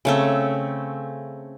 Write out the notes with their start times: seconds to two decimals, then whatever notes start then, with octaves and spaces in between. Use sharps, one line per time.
0.05 C#3 A3 C4